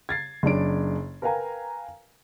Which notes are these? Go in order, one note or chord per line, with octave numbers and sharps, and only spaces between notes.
G#6 A6 C7
F#1 F#2 D4 D7
A#4 B4 F5 G5 G#5 A#5